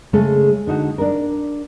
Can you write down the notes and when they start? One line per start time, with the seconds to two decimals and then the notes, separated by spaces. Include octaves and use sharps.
0.13 C#3 G#3 A3 G#4 A4
0.67 D3 D#4 F#4
0.98 D4 A#4